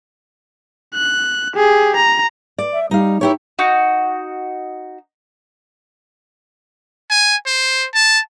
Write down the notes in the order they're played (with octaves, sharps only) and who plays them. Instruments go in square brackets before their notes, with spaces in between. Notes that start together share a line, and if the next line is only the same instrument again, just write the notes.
[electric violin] F#6
G4 G#4
A#5
[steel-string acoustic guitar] D5
[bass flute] E5
[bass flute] G3 [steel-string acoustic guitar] D#4 F5
[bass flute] D#4 [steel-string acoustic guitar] E4 G4 C#5
[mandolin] D#4 F#4
[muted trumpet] G#5
C5
A5